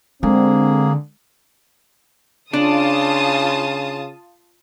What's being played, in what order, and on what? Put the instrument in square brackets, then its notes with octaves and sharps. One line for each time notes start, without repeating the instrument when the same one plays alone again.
[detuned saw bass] D3 [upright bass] G#3 [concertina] A#3 G#4 [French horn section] C4
[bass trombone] C#3 [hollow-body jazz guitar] D4 [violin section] F4 A5 D#6